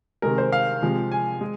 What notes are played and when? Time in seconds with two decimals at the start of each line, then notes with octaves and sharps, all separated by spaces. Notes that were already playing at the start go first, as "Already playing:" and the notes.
0.22 C3 D#3 G#3 A#4
0.38 C5
0.52 F5
0.82 C3 F3 G#3
1.11 G#5
1.41 G#3